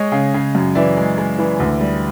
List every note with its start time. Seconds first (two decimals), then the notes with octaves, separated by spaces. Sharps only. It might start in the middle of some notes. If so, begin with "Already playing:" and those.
Already playing: G#3 C#5 D#5
0.12 C#3
0.34 C#3
0.55 F#2
0.75 E3 D5 E5
0.97 G#3
1.18 G#3
1.39 E3
1.59 D2
1.81 G3